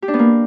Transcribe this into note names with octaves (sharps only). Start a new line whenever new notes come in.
G4
D4
B3
A#3